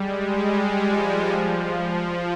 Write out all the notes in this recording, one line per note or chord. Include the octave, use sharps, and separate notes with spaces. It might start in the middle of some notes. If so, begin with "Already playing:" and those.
Already playing: G3 G#3
G3
F3
F3
F3